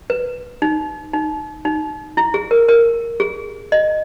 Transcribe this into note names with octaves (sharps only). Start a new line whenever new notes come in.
B4
D#4
D#4
D#4
E4
G#4
A#4
A#4
G#4
D#5